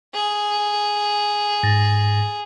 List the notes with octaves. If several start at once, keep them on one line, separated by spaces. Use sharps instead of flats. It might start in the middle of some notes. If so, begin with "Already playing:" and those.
G#4
G#2 A6 A#6